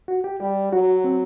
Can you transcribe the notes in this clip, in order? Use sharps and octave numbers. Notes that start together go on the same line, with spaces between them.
F#4
G4
G3 G4
F#3 F#4
C4